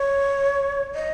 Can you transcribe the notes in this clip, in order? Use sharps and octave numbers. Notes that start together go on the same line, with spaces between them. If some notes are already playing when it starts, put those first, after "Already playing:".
Already playing: C#5
D#5